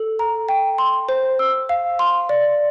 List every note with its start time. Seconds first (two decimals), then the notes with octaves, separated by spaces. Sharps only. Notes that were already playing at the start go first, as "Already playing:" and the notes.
Already playing: A4
0.19 A#5
0.49 G5
0.78 C6
1.09 C5
1.39 E6
1.69 F5
1.99 C6
2.29 D5